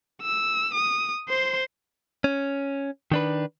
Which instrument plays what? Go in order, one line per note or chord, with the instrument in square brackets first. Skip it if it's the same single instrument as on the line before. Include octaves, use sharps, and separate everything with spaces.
[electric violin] E6
D#6
C5 C6
[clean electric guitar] C#4
D#3 D4 B4